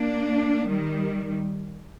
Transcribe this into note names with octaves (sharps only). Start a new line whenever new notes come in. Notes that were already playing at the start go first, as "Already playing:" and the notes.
Already playing: A#3 D4
D#3 G3